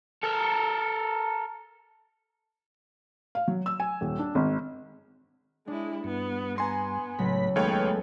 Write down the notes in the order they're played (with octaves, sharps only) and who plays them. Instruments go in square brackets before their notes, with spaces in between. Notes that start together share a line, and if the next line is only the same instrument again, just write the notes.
[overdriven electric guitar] A4 A#4
[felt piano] F5
F#3
E6
G#5
D#1
D4
G#1
[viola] G#3 E4 [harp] D4
[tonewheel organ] G2 [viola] B3
[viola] B3 [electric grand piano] G#5 C6 [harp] A#5 A#6
[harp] C#2 F#3 [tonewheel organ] A2 B5
[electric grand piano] D#2 C#5 G5 [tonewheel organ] G#3 A3 [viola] B3 B4